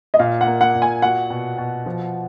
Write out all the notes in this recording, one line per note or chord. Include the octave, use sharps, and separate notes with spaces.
D#5
A#2 F5
F#5
A#3
F#5
A#2
G#5
F#4 F#5
B2
B2
F3